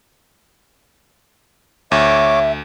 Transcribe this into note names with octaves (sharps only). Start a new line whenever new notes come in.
D2 C#5 E5 D6